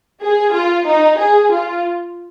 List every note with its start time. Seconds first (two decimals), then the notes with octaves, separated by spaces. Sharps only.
0.21 G#4
0.53 F4
0.86 D#4
1.18 G#4
1.51 F4